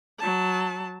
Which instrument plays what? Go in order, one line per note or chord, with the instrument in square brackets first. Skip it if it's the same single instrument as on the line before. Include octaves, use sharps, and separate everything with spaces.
[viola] F#3 A5